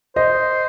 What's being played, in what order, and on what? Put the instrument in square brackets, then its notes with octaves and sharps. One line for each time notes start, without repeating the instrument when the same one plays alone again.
[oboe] C5 [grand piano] D#5